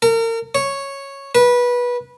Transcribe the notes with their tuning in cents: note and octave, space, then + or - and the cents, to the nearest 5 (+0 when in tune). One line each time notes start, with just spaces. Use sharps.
A#4 -35
C#5 -5
B4 -20